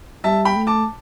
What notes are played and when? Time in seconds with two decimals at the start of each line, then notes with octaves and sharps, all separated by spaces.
0.24 G3 E5 A5
0.45 G5 B5
0.56 A3
0.67 A5 D6